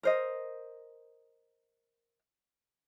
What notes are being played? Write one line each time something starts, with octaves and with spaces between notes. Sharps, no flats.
A#4 C5 D#5